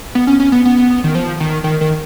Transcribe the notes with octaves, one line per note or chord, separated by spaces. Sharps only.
B3
C#4
C#4
B3
B3
D#3
F3
D#3
D#3
D#3